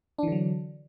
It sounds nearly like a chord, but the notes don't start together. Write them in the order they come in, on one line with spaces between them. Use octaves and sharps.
D4 E3 D3 F#3